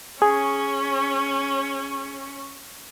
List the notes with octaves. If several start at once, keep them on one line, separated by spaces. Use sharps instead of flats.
C#4 G#4 C#5